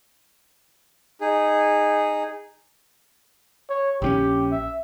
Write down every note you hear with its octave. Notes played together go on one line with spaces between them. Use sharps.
D#4 G#4
C#5
A#1 D3 C#4 G4
E5